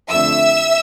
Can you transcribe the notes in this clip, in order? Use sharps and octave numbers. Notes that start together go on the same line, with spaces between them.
F2 D3 A3 E5 E6